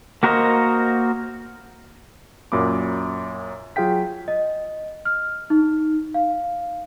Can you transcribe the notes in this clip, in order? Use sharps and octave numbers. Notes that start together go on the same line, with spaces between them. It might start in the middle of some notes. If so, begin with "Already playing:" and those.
A#3 F#4 A#4 C5 D#5
F#2 A#2 F#3 B5 D6
F#3 F4 G#4 F5 G5 B6
D#5
F6
D#4
F5